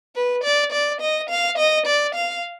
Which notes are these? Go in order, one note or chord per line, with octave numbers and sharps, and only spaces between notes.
B4
D5
D5
D#5
F5
D#5
D5
F5